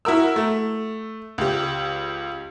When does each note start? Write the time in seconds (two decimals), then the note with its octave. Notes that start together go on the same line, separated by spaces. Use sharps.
0.05 E4 F#4 A#4 E6
0.36 A3
1.38 C#2 G4